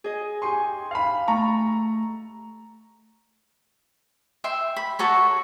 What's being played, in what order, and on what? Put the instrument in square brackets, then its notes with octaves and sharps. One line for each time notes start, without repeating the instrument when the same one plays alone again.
[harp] G#4 D#5
[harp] G4 G#5 C#6 [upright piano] C6
[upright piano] F5 B5
[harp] A3 [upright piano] A#5 C#6
[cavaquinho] E5 G5 C6
B5
F#4 A4 C#5 A#5